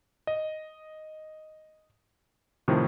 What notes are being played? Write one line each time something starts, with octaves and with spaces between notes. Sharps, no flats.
D#5
A2 C3 D#3 F3 A3